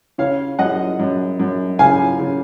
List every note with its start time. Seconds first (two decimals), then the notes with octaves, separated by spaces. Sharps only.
0.18 C#3 C#5 F5
0.59 F#2 D#5 F#5
0.99 F#2
1.39 F#2
1.79 C#3 F5 G#5
2.19 C#3